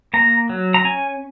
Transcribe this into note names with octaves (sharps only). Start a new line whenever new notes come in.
A#3 A#5
F#3
A#5
C#4 G#5